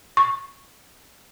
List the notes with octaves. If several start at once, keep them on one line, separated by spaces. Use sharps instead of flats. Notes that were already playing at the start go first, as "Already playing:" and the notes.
C#6